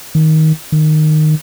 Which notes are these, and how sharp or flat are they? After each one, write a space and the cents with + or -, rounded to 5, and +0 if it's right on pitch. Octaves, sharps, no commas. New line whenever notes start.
D#3 +15
D#3 -15